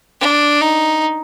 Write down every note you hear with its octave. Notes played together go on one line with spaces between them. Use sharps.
D4
D#4